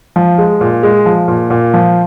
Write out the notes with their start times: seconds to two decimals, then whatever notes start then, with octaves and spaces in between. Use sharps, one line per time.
0.16 F3
0.38 G#3
0.61 A#2
0.83 G#3
1.06 F3
1.28 A#2
1.50 A#2
1.74 F3